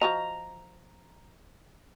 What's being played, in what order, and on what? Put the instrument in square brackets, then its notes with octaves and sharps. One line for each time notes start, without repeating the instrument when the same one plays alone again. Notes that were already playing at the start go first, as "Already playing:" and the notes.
[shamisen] F3 F#4 D#5 [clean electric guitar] A#5